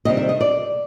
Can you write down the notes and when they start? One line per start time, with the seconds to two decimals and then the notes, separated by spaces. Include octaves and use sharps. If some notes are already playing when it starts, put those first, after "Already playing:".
0.05 C3 D#3 G3 C4 D#5
0.17 E5
0.29 D#5
0.41 D5